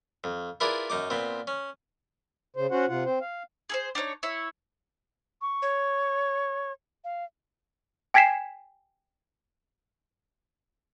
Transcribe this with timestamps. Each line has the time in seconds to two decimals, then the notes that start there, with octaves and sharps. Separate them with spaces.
0.24 F2
0.60 E4 F4 G#4 A#4 B4 D5
0.90 F#2 D#4 D6
1.10 A#2 B3 C4
1.47 C#4
2.56 C#3 C5
2.71 C#4 F#4 C5 F#5
2.89 C3 F4 F#5
3.06 C4 C5
3.21 F5
3.69 G#4 A4 C5
3.95 D4 D#4 A#4 C#5
4.23 E4 C#5
5.42 C#6
5.62 C#5
7.04 F5
8.14 G5 G#5 G#6 B6 C7 E7